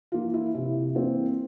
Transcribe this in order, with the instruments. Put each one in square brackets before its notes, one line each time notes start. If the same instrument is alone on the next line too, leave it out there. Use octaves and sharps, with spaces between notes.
[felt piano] E3 A#3 F4
E4
C3 E4
E3 A#3 C4